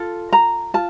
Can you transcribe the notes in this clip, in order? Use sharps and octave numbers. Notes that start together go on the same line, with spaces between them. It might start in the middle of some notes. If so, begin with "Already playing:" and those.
Already playing: F4 A4
A#5
F4 A5